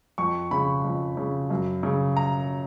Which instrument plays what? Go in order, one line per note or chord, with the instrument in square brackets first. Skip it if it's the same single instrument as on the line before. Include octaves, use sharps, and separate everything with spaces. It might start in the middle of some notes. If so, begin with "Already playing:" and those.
[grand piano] F2 C#6
C#3 B5
F2
C#3
F#2
C#3
A#5